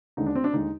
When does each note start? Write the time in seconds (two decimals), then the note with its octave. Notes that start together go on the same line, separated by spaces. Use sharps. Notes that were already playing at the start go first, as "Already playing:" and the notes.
0.17 D#2 D3 G#3 D#4
0.26 D4
0.35 C4
0.44 D4
0.53 D#2 D3 G#3 D#4